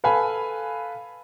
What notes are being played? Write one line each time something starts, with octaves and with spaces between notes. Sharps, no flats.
A4 B4 F5 G#5 B5